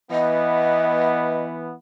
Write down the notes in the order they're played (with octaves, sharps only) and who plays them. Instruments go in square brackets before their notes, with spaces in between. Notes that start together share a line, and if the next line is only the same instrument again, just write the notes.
[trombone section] E3 B3 [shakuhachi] D#5